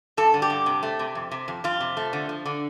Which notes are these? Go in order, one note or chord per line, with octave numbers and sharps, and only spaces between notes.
G2 A4
D3
G4
G2
C3
A3
C3
F2
C3
F2
F2 F4
C3
A3
D3
F3
D3